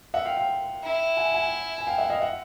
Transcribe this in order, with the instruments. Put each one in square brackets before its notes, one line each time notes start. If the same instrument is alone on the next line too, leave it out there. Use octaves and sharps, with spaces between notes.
[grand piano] E5 F#5
F5 G5
F5 G5
[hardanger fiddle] E4
[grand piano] F#5 G#5
F#5 G#5
G#5
F5 G5
E5 F#5
D#5 F5
E5 F#5